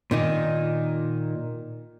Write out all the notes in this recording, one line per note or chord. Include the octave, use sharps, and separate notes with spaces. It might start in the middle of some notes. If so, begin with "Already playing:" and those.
A#2 D#3 D#4